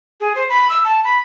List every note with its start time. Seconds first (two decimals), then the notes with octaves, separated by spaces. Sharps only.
0.21 G#4
0.35 C5
0.49 B5
0.69 E6
0.84 A5
1.04 B5